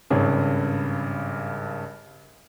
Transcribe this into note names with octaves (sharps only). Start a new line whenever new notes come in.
G#1 G2 C#3 G#4 C#5